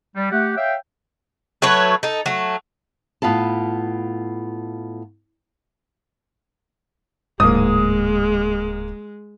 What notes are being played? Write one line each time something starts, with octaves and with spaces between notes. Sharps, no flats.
G3
A3 G4 F#5
C#5 E5 F5 G5
F#3 A3 B4 C#5
D#4 A4
F#3 A3
A2 B3 F4 F5 A5
D1 G#2 G#3 A#3 D#6